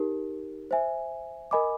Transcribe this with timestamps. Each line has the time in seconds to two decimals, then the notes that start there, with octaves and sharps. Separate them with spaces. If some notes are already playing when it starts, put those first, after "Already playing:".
Already playing: D#4 G4 A#4
0.71 C5 E5 G#5
1.51 A#4 D#5 G#5 B5 D6